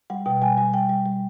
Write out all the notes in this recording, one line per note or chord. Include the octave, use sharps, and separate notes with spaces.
G3 F#5
B2 G5
G3 G#5
G3 G#5
G3 G5
G3
G3